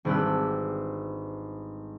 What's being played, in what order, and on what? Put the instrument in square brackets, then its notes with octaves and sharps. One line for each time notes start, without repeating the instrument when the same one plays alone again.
[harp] G#1 G3 D4 B4 E6